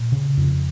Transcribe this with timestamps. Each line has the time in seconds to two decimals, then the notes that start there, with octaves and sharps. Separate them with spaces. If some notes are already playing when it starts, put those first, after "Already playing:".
Already playing: A#2
0.12 C#3
0.37 F2